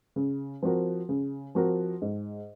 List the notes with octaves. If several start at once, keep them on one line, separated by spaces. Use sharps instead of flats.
C#3
F3 C4 F#4 A#4
C#3
F3 C4 F#4 A#4
G#2